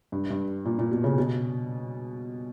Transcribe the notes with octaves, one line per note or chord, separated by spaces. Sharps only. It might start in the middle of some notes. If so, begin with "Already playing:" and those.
G2
G2
A#2
A#2
B2
C#3
B2